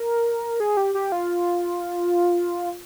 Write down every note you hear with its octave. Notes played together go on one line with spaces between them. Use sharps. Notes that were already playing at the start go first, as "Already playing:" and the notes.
Already playing: A#4
G#4
G4
G4
F4